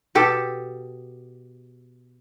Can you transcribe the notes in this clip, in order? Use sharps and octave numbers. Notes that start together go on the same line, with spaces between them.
B2 G4 A4